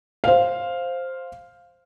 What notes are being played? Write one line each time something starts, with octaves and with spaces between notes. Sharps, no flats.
C5 F5